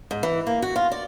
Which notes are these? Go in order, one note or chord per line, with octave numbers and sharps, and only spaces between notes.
G#2
E3
A#3
F#4
F4
D5